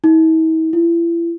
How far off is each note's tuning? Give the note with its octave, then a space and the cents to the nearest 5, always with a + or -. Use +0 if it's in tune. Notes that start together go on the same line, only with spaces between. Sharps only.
E4 -45
E4 +40